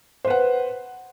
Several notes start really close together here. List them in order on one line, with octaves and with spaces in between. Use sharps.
C5 B4 F#5